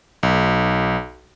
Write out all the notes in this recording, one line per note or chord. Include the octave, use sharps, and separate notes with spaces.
B1